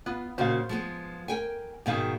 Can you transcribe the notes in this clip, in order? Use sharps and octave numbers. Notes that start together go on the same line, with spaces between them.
B3 F4
A#2 C#3 F#4 C5 F5
F3 G#3 B3
A#4 G5 G#5
G#2 B2 D#3 G#4 F5 G5